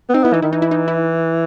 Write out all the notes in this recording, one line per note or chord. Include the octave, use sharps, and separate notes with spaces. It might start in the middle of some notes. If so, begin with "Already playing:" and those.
B3
C4 D#4
B3 E4
E3 D#4
D#3 E4
E3 D#4
E4
D#4
E4